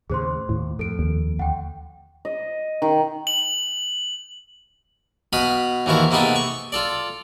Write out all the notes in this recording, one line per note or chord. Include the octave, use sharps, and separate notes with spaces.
D#2 A2 C#3 G#4 C5 C6
D#2 A2
F2 A4 D7
D#2
D2 F#5 G5
D#5
D#3
F#7
B2 F5 B5 D#6
D#2 E3 F3 F#4 F5
C3 A#3 B3 D#4 G#4 A4
C#6
F4 A4 D5